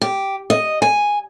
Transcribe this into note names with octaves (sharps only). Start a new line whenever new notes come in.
G4
D#5
G#5